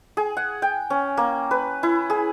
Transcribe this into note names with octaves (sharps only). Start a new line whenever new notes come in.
G#4
F#5
G5
C#4
A#3
B4
E4
G#4